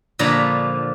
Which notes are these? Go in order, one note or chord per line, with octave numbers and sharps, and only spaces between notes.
A#2 D3 F3 C#5 A#5 B5